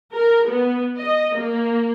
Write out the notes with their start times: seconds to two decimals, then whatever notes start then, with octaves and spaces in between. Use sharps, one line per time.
0.13 A#4
0.47 B3
0.98 D#5
1.37 A#3